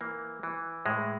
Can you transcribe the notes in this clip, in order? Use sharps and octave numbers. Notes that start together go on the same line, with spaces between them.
E3 A#3
E3
A2 G#3